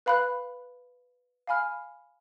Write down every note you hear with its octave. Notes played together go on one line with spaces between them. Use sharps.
B4 F5 B5 F#6
F5 G#5 B5 F6